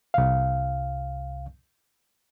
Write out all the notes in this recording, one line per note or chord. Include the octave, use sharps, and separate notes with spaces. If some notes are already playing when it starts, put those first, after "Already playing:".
C2 F5